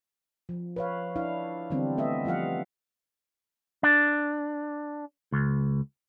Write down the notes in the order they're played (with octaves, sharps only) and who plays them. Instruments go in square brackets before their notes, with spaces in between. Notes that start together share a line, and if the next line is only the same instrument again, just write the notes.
[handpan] F3
B4 C#5 F5
D4 E4 F5
D3 E3 G3 B3 C4 D4
A3 B3 D#5 E5
F3 G3 F4 F5 F#5
[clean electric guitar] D4
C#2